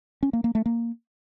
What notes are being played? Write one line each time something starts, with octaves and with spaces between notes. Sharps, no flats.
C#4
A#3
A#3
A3
A#3